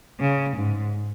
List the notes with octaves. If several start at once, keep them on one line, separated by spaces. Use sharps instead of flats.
C#3
G#2